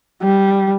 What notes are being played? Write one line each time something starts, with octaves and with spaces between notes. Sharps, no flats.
G3